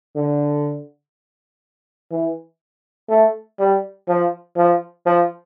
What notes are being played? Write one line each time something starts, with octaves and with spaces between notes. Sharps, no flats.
D3
E3
A3
G3
F3
F3
F3